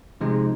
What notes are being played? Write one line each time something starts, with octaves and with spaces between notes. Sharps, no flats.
C3 F3 G#3 D#4